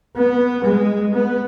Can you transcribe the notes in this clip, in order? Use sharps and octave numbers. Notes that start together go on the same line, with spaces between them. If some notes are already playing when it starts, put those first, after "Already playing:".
B3
G#3
B3